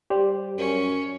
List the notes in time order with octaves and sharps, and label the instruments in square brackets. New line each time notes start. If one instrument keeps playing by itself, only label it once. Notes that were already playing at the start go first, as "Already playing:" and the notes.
[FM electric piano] G3 [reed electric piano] G4 C5 D5
[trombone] F#2 [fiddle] C#4